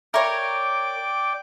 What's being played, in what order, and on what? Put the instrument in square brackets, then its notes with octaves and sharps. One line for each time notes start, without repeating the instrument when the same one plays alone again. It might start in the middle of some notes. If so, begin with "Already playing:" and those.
[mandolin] A#4 C#5 [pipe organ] D5 G5 D6 [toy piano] E5 F5